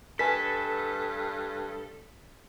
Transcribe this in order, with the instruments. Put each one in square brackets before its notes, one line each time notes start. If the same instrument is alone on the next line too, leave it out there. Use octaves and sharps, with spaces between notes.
[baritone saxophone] G2 [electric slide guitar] A4 [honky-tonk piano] B4 G#5 [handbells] B6